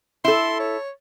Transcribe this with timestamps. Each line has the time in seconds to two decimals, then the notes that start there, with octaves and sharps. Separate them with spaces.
0.25 E4 A4 C6
0.60 C#5